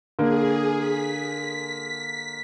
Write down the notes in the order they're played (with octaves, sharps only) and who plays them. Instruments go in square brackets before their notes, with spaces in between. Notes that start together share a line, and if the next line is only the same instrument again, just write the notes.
[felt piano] D3 A#3 [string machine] G#4
[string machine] B6